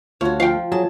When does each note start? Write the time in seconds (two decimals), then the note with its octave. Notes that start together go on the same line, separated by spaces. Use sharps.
0.21 D2 A3 F4 F#4 C#5
0.40 F3 F5 G5
0.72 F#3 G#4 A5